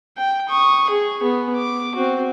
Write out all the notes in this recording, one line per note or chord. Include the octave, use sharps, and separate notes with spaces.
G5
C#6 D#6
G#4
B3
D6
C4 F#4